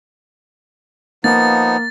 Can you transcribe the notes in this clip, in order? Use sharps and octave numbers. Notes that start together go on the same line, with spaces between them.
F3 A#3 B3 D#4 A6